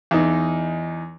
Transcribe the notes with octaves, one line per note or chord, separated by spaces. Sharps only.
E2 D#4